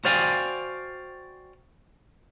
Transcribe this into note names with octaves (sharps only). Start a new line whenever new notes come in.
F#4 C5 D5 F5 G5 G#5